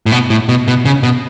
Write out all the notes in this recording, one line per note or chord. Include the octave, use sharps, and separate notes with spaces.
A2
B2
A2
B2
B2
C#3
B2